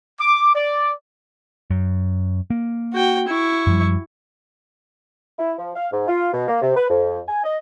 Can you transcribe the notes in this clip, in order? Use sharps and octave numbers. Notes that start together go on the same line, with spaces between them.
D6
D5
F#2
A#3
F#4 G5
E4 C#6
F#2 F3 G3
E4
F3
F5
G#2
F4
B2
A#3
C3
B4
F2
G#5
D#5